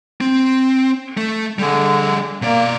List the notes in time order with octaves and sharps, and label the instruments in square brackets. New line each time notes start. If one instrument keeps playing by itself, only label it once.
[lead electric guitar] C4
A3
[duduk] D3 [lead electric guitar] G3 G#4
[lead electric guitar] B2 D5 [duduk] A#3